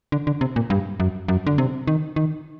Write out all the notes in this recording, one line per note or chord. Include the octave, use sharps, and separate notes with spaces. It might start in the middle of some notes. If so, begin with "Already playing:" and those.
D3
D3
C3
A#2
G2
F#2
F#2
D3
C3
D#3
D#3